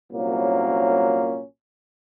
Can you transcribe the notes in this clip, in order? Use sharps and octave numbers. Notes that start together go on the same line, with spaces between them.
C2 A#2 F#3 A#3 C#4